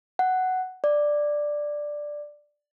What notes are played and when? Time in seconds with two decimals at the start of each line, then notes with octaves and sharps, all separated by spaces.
0.19 F#5
0.84 D5